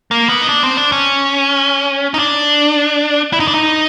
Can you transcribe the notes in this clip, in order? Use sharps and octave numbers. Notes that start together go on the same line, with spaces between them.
A#3
B3
D#4
D4
C4
D4
C#4
D#4
D4
E4
D#4
D4
D#4